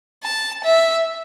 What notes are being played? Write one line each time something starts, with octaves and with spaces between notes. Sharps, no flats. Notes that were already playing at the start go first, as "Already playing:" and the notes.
A5
E5